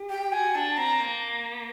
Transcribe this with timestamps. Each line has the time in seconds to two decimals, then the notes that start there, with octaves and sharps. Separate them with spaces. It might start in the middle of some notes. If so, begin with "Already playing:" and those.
Already playing: G4
0.10 G5
0.32 F#4 G#5
0.55 D4 A5
0.77 C4 A#5
1.00 A#3